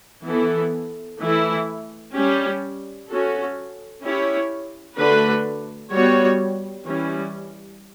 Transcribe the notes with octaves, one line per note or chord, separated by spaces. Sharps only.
E3 B3 E4 A4
E3 A3 E4
G3 C#4 G4
C#4 F#4 A4
C#4 E4 G4 C#5
D3 A3 D4 F#4 B4
G3 B3 F#4 C#5
E3 G3 C#4